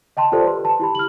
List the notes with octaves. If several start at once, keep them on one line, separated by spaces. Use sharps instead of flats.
D#5 G5 A5 C6
F4 G4 A4 C5 D5
B4 C6
A5
E4 G4 B5
F6 F#7